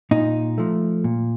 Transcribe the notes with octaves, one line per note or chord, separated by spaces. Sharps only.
A#2 D#4
F3 A3
A#2